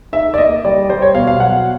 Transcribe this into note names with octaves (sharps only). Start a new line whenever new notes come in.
D#4 E5
D5
A#3 D#5
G3 D5
G3 C5
C#5
B2 F5
F5
F#3 F#5